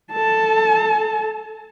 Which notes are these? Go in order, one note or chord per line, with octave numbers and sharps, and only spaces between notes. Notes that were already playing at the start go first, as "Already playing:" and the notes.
A4 A5